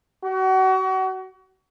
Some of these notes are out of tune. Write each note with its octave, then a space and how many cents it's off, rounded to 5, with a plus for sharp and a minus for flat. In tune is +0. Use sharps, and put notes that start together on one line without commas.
F#4 +35